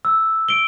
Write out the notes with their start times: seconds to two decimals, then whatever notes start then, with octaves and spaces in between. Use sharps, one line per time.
0.05 E6
0.49 D7 G7